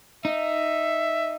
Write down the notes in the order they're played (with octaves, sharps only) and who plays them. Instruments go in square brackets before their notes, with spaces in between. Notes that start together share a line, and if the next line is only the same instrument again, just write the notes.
[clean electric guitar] D#4 [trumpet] E5